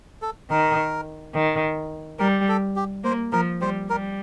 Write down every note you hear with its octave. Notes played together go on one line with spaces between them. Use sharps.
A4
D#3 A#4
D#3
G3 A#4
A4
G4
A#3 C5
F3 A#4
G3 C5
G3 A#4